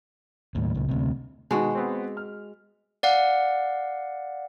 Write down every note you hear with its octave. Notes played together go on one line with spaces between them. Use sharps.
D#2 A2
C#2 A#2
D2 C3
B2 D#3 G#3 F#4
B3 C4
F6
D5 F5 F#5